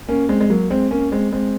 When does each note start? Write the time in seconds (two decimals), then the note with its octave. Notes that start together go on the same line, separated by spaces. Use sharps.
0.09 A#3 C#4
0.29 G#3 C4
0.40 G#3
0.50 F#3 A#3
0.70 G#3 C4
0.91 A#3 C#4
1.12 G#3 C4
1.32 G#3 C4